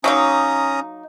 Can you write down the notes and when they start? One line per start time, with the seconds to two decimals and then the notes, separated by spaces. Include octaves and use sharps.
0.04 F#3 A#3 C#4 D#4 A#5 D#6